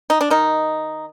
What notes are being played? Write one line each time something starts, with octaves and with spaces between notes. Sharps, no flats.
D#4
D4
D#3 D#4